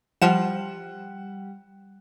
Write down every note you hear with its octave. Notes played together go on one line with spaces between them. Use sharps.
F3 G3 F#5 E7